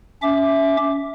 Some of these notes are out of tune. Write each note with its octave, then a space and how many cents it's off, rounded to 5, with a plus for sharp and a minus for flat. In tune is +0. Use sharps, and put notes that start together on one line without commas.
C#4 +25 E5 +0 D6 +0